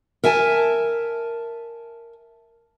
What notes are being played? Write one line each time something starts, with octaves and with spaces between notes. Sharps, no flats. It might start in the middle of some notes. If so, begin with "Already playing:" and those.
A#4 E5 G#5 A5